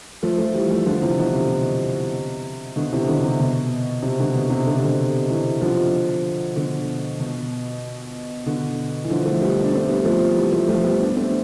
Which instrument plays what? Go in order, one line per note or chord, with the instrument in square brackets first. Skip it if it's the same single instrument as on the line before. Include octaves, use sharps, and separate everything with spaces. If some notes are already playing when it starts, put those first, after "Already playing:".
[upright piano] F3 A3
F3 A3
E3 G3
F3 A3
D3 F3
C3 E3
B2 D3
C3
B2 D3
C3 E3
B2 D3
C3
B2
C3
B2 D3
B2
C3
D3
C3
B2 D3
C3 E3
D3 F3
B2 D3
B2
B2 D3
E3
D3 F3
F3 A3
G3 B3
D4
A3 C4
G3 B3
F3 A3
E3 G3
F3 A3
F3 A3
G3 B3
B3 D4
A3 C4